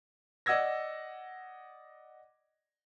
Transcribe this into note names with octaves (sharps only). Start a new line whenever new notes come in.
D5 D#5 F#5 E6 G#6 A#6